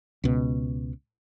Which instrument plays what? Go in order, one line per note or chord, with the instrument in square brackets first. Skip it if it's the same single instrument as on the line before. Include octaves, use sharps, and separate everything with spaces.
[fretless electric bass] C#2 B2